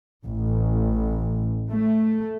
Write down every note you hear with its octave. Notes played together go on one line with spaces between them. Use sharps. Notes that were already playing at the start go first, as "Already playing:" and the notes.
A1
A3